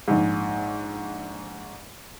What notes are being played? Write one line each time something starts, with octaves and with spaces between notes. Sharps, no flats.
A#1 G#2